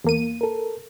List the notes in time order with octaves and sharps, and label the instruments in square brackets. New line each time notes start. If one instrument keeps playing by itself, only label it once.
[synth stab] E2 A#3 D#7
[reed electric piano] A4 A#4